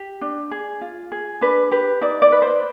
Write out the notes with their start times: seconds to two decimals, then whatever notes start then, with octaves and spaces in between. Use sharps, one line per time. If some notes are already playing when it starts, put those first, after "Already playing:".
Already playing: G4
0.21 D4
0.51 G#4
0.81 F4
1.12 G#4
1.41 D4 B4
1.71 G4 B4
2.01 D#4 D5
2.22 D5
2.32 B4
2.42 C5